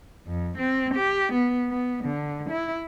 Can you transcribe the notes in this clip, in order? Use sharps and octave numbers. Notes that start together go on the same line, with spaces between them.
F2
C4
G4
B3
B3
D3
E4